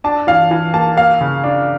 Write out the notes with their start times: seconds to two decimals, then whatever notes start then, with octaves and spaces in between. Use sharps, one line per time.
0.04 D4 A5
0.27 E3 F5
0.51 E3
0.74 A#3 A5
0.97 A#3 F5
1.21 C#3
1.44 D4